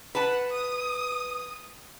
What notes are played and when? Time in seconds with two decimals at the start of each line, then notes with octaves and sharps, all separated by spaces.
0.15 B4 F#5 A5
0.51 D#6